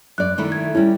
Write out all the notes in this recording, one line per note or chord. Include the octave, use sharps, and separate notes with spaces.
F#2 D5 F#6
D#3 A3 E4
G#6
G3 C#4 E4